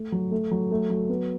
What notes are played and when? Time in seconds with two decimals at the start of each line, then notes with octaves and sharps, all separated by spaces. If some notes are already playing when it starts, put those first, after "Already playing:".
Already playing: A3
0.12 F#3
0.31 A3
0.51 F#3
0.71 A3
0.90 F#3
1.09 B3